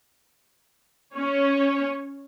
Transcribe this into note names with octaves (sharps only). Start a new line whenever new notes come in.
C#4 C#5